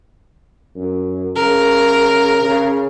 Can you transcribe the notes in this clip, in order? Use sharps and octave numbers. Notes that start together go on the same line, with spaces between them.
F#2
C#3 A#4
C#3